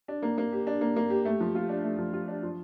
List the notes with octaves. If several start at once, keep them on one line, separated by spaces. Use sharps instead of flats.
D4
A#3
A#3
G4
D4
A#3
A#3
G4
A3
F3
F4
D4
A3
F3
F4
D4
F3